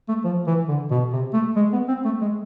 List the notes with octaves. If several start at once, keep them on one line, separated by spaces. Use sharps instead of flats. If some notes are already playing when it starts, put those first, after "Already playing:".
A3
F3
E3
D3
B2
C3
A3
G#3
B3
C4
A3
G#3